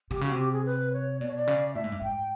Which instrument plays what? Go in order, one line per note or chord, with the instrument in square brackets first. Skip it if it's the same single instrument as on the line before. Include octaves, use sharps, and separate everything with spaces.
[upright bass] C3 [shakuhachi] G4
[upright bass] C#3 [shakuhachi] F#4
[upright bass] C3
[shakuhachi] G4
G#4
B4
C#5
[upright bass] B2 [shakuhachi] D5
[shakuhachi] C#5
D5
[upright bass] C#3
[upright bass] A2 [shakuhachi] E5
[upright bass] G#2
G2
[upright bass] G#2 [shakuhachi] G5